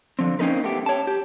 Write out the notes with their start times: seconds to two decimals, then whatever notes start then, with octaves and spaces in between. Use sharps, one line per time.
0.19 D3 F3 C4
0.39 A#3 C4 C#4 D#4 A#4 B4
0.64 A3 B3 G4
0.86 C#5 A5
1.07 G4